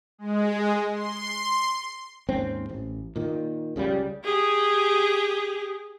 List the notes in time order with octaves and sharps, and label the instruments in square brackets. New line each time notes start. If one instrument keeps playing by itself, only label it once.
[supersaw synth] G#3
C6
[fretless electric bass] D#2 G#2 C4 C#4
A1
A#2 D#3
C#2 C#3 E3 G3
[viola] G4 G#4